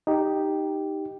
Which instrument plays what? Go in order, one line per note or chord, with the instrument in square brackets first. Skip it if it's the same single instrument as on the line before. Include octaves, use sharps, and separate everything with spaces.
[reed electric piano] D#4 G4